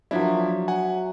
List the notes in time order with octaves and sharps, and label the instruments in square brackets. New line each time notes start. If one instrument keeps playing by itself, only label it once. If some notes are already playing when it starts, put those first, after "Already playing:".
[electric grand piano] F3 D4 E4 [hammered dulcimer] F#3 E5
[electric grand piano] F#5 G#5